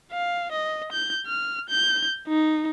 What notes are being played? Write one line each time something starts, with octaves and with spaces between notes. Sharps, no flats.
F5
D#5
G6
F6
G6
D#4